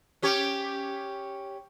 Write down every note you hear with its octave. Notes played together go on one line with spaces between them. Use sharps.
C#4 G4 C#5